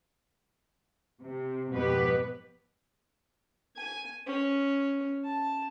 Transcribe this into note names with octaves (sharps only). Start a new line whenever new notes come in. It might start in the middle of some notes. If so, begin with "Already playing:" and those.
C3
F2 G#2 B2 B3 G4 B4
G#5
C#4
A5